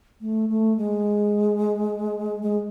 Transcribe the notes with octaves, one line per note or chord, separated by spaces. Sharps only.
A3
A3
G#3
G#3